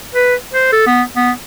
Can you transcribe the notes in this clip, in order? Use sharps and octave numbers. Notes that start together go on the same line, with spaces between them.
B4
C5
A4
B3
B3